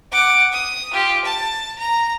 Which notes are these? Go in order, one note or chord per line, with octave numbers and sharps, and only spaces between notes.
F#5 D6
D#6
F4 G4
A5
A#5